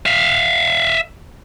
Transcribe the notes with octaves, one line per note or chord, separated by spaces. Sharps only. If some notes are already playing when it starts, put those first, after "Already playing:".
E5 F5